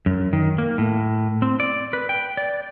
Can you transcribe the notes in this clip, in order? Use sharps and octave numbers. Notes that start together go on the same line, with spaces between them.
F#2
D#3
A#3
A2
C4
D5
B4
G5
D5